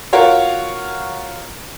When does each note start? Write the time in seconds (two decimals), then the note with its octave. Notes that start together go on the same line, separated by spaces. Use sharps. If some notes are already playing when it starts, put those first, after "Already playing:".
0.13 F4 F#4 A#4 C#5